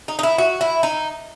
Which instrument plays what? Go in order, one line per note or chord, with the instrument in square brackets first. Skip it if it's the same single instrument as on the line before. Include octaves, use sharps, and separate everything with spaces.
[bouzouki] D#4
D#4
E4
F#4
E4
D#4